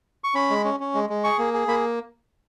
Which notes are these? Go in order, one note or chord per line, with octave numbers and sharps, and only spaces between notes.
C#6
C#4 B5
G#3
C#4
C#4
G#3
G#3
G#4 C#6
A#3
G#4
A#3 B5